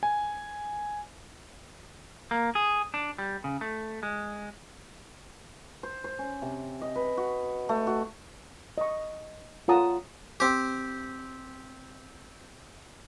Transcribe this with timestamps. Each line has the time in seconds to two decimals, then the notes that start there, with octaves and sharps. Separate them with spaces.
0.03 G#5
2.31 A#3
2.55 G#4
2.94 D4
3.19 G3
3.44 C#3
3.61 A3
4.03 G#3
5.83 C5
6.04 C5
6.19 C#4
6.42 C3
6.82 D#5
6.96 B4
7.17 F#4
7.69 A3
7.87 F#4
8.78 D#5 C#6
9.68 F4 C#5 F#5 A5 A#5 D#6
10.40 C4 G4